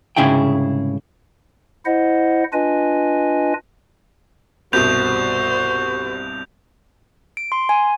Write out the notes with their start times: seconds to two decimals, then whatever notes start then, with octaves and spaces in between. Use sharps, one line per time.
0.17 C2 G#2 C#3 E4 G#4 G5
1.86 E4 C5 D#5 F#5
2.53 D4 F4 B4 D#5 G#5
4.73 C2 G2 B2 F#4 C5 G6 F7
7.37 D7
7.52 C6
7.69 G#5